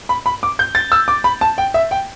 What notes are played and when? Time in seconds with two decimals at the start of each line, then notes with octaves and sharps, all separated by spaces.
0.09 B5
0.26 B5
0.43 D6
0.59 G6
0.75 A6
0.92 E6
1.08 D6
1.24 B5
1.41 A5
1.58 G5
1.74 E5
1.91 G5